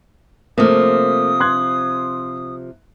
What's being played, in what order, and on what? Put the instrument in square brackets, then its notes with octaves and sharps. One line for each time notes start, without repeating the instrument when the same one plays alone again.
[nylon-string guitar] C3 F3 [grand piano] A3 A#3 [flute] D#6
[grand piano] C6 F#6 G#6